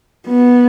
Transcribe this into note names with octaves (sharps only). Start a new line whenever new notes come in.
B3